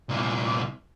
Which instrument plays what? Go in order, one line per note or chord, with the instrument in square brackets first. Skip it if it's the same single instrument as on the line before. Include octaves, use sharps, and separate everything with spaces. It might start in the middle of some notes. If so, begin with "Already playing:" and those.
[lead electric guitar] C2 A#2